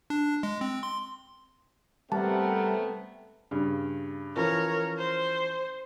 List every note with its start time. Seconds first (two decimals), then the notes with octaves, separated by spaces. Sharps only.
0.10 D4
0.43 G#3
0.61 C4
0.83 C6
2.12 C3 G3 A3 B3 C4 A#4 F#5 A5
3.51 G2 C#3
4.36 E3 F3 C#4 A#4 C#5
4.98 C5